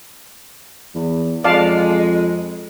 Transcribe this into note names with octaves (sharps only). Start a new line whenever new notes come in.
E2
F2 G#3 D5 F5 A5